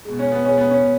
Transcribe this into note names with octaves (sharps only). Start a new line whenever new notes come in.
B2 G#3
C#4
B3
B2 G#3 C#4
B3
C#4
B2